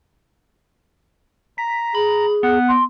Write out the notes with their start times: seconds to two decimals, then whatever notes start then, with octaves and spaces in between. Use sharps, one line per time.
1.58 A#5 B6
1.95 G#4 B5
2.43 B3 F#5
2.68 C6